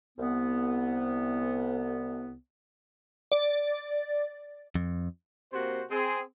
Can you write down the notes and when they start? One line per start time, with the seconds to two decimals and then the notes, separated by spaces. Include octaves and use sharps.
0.18 C2 B3
3.32 D5
4.75 F2
5.53 C3 A#3 F#4 C5
5.91 C4 G#4